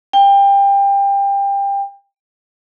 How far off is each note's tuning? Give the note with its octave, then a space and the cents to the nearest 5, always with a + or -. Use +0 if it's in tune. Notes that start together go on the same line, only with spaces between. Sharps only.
G5 +25